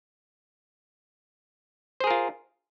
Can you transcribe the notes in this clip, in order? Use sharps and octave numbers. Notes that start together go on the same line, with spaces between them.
F4 G#4 A#4 C5